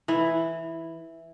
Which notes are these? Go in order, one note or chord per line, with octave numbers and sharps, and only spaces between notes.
E3 E4